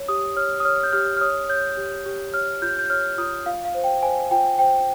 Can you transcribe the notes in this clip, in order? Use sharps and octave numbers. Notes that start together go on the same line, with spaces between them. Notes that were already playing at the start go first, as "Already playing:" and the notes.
Already playing: C#5
G4 D#6
C#5 F6
D#6
C#5 F6
G6
G4 F6
F6
C#5 D#6
C#5 G6
G4
G4
C#5 F6
F4 G6
G6
C#5 F6
F4 D#6
F4 F5
F5
C5
G5
C5 G#5
F4 G5
C5 G5